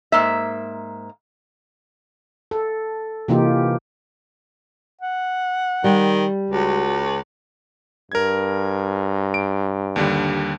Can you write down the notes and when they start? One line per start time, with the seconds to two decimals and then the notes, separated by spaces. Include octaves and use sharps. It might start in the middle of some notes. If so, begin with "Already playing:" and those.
0.12 G#2 A#3 E5
2.51 A4
3.28 C3 E3 A#3 D#4 F4 G4
5.01 F#5
5.84 D#3 G3
6.51 C#2 F#4
8.12 G2 A#4 G#6
9.34 D7
9.96 D#2 D3 G3